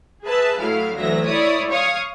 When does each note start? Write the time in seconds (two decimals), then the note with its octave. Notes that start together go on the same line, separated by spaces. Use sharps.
0.24 G#4 B4 E5 A5
0.59 A2 F#3 E4 F5
0.95 D2 E3 F#3 E5 A#6
1.25 E4 C#5 D5 D#6
1.70 C#5 F5 C#6 D#6